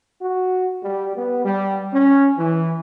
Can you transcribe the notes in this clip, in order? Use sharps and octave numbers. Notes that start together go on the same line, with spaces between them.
F#4
G3
B3
G3
C#4
E3